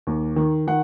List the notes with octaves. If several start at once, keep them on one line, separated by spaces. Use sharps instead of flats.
D#2
D#3
D#3 F#5